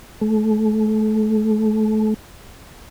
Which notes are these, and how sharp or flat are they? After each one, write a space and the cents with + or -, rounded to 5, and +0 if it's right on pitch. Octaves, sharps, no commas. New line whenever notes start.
A3 -30